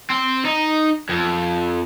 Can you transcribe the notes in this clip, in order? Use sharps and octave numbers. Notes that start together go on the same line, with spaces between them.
C4
D#4
F2